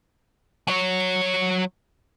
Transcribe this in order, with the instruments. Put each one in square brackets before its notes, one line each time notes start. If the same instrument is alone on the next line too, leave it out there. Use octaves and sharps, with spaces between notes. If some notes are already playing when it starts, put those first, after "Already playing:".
[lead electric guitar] F#3 C#5